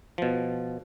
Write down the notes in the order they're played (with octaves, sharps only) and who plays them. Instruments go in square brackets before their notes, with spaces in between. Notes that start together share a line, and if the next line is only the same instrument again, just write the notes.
[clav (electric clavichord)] B2 F3